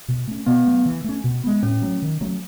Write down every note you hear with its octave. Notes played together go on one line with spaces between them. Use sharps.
B2
A3 C#4
B2 B3
F#3 A3
E3
A3 C#4
B2
G#3 B3
A2 C#4
F#3 A3
D#3
F#3 A3 C#4